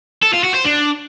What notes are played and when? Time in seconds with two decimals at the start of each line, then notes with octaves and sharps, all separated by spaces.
0.22 A4
0.33 F4
0.44 F#4
0.54 C5
0.65 D4